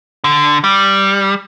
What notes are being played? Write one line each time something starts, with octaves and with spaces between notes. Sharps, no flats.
D3
G3